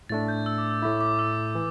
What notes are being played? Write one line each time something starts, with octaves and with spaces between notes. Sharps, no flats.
A2 A3 D4 A6
G6
E6
D6
E6
A2 A3 E4 D6
D6
E6
E3